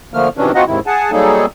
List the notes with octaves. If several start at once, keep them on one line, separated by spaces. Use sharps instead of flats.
D3 F3 A3 A#3 F6
C3 D#3 E3 F#3 C#4 D4
C4 D#4 F4 F#4 D#5 F#5
D#2 G#2 C3 D#3 E4
G#4 F#5 G#5 A5
F#3 G3 A#3 D#4 G#4 A4